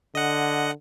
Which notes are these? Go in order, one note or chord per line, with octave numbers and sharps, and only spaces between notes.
D3 D#5 F#5